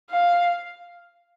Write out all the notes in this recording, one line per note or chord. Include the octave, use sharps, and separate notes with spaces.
F5